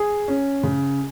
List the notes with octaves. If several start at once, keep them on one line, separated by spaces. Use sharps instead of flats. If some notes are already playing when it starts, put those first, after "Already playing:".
Already playing: G#4
C#4
C#3